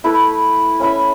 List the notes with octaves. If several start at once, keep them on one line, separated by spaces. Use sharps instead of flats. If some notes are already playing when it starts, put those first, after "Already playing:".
A3 E4 B4
C#4 E4 B4 E5